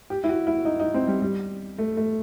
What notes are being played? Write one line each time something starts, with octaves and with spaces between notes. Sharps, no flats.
G4
E4
F#4
E4
D#4
D#4
C4
G3
G3
A3
A3